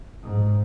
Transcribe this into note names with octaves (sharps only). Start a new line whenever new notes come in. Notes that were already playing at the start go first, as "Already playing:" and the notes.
G#2